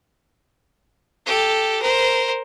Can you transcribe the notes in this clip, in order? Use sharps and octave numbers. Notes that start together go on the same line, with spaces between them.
G4 A4
A#4 C5